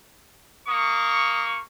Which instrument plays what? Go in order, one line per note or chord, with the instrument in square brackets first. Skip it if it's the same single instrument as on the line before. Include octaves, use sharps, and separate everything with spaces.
[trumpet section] A#3 C#6 [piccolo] D#6